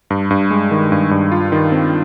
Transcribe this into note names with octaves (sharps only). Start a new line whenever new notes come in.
G2
G2
G#3
D#3
G2
G2
F4
D#3
C4